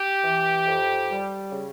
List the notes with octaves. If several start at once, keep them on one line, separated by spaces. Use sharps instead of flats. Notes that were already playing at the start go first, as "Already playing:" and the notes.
Already playing: G4
E3
F2
G3
C#3